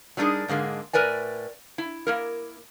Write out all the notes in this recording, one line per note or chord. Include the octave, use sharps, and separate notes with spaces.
F#3 G3 D4 D#4 G#4 A#4
G#2 D3 G#3 A#3
A2 A#4 B4 D5 G#5
E4
A#3 E4 A#4